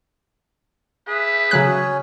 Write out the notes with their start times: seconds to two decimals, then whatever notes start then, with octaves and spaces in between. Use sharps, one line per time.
1.08 G#4 B4 E5
1.51 C#3 F#3 C#4 C#5 F#6